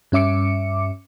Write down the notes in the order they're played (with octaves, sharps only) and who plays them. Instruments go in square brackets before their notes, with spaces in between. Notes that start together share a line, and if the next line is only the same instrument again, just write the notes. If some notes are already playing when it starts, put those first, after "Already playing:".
[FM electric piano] G2 C#4 E5 D6 C#7